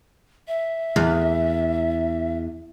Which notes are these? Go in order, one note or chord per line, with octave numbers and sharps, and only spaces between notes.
E5
E2